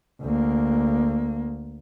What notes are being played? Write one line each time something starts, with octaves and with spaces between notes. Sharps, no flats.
D2 A#3